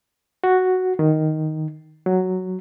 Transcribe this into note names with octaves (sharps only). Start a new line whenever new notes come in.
F#4
D#3
F#3